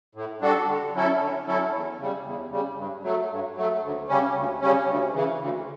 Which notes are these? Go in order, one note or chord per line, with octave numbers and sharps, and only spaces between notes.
A2
G3 D4 F#4 A4
D3
F#3 C#4 E4 A4
D3
F#3 C#4 E4 A4
E2
C#3 G3
E2
C#3 G3
G2
F#3 A3
G2
F#3 A3
D2
C#3 G3 C#4
D2
C#3 G3 C#4
D2
C#3 E3
D2